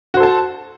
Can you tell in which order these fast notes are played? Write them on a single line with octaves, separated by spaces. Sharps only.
F#4 C5 A4 A5